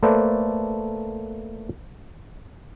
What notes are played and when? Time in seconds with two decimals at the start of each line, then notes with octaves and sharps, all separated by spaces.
0.03 A3 A#3 A4 B4 C5 D5